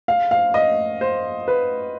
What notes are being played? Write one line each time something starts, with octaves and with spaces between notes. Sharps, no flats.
F5
F5
D#5
C5
B4